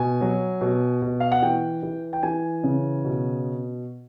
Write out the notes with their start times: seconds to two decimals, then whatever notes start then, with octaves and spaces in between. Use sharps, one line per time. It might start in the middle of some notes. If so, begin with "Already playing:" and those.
Already playing: B2 G#5
0.21 F#3
0.61 B2
1.02 B2
1.20 F5
1.32 F#5
1.42 E3 G5
1.83 E3
2.13 G5
2.23 E3 G#5
2.64 C#3
3.04 B2